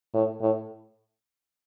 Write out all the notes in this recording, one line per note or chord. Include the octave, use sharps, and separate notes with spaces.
A2
A2